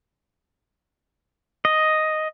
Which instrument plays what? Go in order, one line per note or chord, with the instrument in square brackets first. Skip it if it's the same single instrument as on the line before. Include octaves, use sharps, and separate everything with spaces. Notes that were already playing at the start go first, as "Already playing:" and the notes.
[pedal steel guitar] D#5